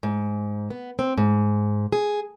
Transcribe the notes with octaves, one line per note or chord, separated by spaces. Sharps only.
G#2
B3
C4
G#2
G#4